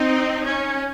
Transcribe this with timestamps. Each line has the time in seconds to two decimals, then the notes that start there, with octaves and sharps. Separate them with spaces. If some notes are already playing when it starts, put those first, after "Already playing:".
Already playing: C4 D#4
0.44 C#4